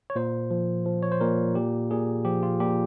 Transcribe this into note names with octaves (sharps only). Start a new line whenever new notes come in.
C#5
A#2 C5
F3
F3
C#5
C5
A#2 A#4
A#2 G4
A#2 G#4
F3 G4
F4
A#2 G4